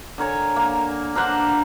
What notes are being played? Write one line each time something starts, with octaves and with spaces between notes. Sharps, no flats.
D3 A#4 C#5 G#5
A#3
D4 A#4 C5 F#5